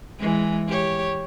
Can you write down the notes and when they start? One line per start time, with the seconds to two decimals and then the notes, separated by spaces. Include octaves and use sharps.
0.18 E3 G#3
0.68 G4 C#5